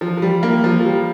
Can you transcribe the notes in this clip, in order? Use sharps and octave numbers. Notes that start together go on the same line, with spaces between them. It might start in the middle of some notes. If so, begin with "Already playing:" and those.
F3
F3
G3
A#3
F3
F3
G3